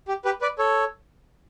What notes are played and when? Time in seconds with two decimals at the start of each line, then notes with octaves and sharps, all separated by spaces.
0.08 G4
0.25 G4 B4
0.42 B4 D5
0.59 A4 C#5